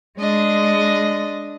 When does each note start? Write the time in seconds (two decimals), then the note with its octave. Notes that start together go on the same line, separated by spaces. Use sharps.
0.19 G#3 D4 D#5